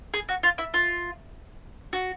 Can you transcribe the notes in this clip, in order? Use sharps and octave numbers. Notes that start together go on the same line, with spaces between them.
G#4
F#4
F4
E4
F4
F#4